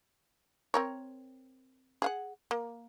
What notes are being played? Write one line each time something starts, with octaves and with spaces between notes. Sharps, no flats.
C4 A#4 C#5
G#4 F5 F#5
A#3